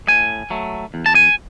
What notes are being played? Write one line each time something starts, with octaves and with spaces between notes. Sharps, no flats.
A2 G#5
F#3 A3
E2
A5
G#5